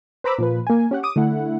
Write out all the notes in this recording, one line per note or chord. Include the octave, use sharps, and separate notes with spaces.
B4 C5 A#5 B5 D6 E6
A#2 F3 B4
A#3 G#5
C#4 G4 F#5
D6 D#6 D#7
D3 A3 E4 F#5